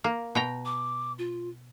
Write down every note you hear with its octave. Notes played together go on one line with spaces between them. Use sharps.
A#3
B2 G5 A#5
D6
F4